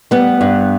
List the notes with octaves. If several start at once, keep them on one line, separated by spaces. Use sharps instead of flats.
G3 B3
G2